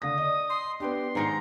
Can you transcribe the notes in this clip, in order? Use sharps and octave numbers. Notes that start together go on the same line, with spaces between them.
D3 F5 D#6 A#6
D5 D#5
C6
B3 D4 G4 C6
G#2 D#3 G#3 A#5